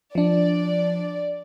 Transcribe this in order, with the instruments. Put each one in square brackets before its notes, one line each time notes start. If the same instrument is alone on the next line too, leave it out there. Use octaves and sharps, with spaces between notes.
[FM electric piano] F3 D4 [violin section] D5